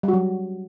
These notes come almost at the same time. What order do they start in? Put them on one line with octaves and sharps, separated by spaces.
G3 F#4 F#3